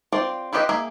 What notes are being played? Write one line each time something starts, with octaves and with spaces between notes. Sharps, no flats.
C4 F4 D5
E4 F4 G4 B4 D#5
A#3 G#4 E5